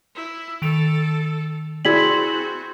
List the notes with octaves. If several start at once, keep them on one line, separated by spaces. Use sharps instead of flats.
E4
D#3 A4 D7 F7
C4 E4 F#4 G#4 D5 G#6 B6 F#7